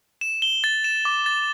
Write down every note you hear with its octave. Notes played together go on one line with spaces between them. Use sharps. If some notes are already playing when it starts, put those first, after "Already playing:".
E7
G7
A6
E7
D6
A6